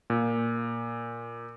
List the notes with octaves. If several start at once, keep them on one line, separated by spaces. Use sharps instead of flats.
A#2